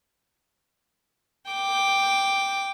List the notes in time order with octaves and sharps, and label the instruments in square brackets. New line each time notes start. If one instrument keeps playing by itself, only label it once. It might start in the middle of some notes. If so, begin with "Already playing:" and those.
[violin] G5 D6